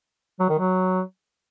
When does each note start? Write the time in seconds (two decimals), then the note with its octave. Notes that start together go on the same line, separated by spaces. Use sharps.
0.40 F#3
0.49 D#3
0.59 F#3